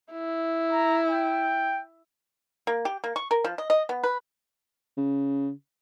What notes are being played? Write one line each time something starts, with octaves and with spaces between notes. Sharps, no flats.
E4
A#5
G5
A#3
G4
A#3
C#6
A#4
F3
D#5
D#5
B3
B4
C#3